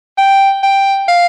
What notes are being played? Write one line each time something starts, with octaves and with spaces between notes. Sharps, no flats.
G5
G5
F5